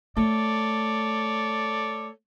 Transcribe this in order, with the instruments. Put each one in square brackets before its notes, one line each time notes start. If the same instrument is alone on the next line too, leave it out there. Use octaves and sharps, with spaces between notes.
[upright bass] A3 [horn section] A4 C#5 D5